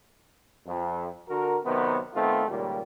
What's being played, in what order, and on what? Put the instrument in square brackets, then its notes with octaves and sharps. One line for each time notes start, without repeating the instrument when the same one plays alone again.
[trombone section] F2
D3 F#4 A#4
C3 D#3 F#3 B3
D#3 A3 B3 C4 F4
C#2 A#2 D#3 G3